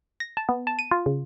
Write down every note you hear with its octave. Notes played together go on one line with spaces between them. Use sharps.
A#6
A5
B3
A5
D#7
F4
C#3